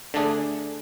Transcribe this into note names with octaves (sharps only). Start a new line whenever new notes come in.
D3 A3 D4 G#4